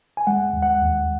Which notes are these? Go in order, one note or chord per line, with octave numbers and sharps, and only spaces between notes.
G#5
G#3 F#5
D#2
F#5
D#2